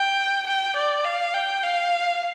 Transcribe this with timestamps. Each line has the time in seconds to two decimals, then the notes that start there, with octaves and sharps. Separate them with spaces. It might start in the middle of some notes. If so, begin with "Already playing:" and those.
Already playing: G5
0.47 G5
0.76 D5
1.05 F5
1.34 G5
1.64 F5